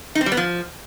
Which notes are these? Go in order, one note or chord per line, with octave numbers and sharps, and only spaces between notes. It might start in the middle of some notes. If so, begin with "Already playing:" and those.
D#4
C4
G3
B3
F3